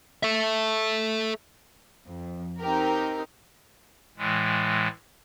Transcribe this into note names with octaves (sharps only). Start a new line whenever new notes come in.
A4 E5
F2
C4 D#4 G4 A#4
A2 E3 G#3